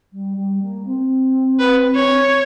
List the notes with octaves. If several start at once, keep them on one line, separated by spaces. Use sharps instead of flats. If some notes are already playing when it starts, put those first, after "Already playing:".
G3
G3
A#3
C4
B4
C#5